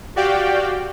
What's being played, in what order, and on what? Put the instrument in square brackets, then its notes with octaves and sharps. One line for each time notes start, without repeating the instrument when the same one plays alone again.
[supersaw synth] F#4 G4 D5 F5 G5